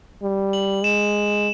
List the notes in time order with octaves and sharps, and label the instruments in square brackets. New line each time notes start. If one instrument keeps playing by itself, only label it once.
[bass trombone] G3
[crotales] F#7
[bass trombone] G#3 [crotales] E7